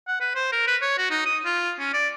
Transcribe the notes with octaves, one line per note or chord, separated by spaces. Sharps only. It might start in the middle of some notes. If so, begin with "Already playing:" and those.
F#5
B4
C5
A#4
B4
C#5
F#4
D#4
D#6
F4
C#4
D5